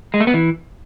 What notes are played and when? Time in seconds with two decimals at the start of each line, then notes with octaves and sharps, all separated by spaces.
0.14 G#3
0.20 A3
0.27 B3
0.34 E3